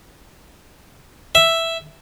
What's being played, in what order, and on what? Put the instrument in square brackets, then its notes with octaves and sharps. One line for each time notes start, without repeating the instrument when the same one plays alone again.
[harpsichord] E5